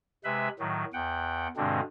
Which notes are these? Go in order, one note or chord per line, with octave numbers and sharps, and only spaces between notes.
C3 G#3 B4 E5 B5
A2 D#3 F#3
E2 F#5 G5
G2 B2 D3 G#3 C4 D4